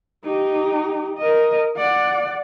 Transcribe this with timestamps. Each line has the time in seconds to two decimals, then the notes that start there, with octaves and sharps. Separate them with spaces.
0.24 D#4 G4
1.18 A#4 D#5
1.77 D5 F#5